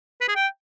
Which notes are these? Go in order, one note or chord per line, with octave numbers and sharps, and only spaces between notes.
B4
G#4
G5